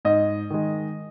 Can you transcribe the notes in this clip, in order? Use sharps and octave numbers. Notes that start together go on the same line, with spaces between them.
G#2 D#5
D#3 G#3